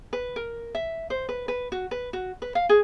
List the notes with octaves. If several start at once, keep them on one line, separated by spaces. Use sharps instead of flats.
B4
A#4
E5
C5
B4
B4
F#4
B4
F#4
B4
F5
G#4